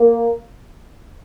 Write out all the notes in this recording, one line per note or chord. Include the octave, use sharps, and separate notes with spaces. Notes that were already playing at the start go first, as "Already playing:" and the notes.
Already playing: A#3